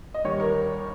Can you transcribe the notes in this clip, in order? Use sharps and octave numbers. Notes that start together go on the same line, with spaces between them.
D#5
D#2 D#3 G3 C#5
A#4